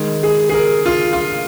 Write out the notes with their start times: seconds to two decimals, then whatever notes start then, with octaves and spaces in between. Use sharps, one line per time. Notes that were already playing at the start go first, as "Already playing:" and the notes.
Already playing: D#3 G#3
0.23 G#4
0.49 G#4
0.54 A#4
0.86 F4
1.13 F4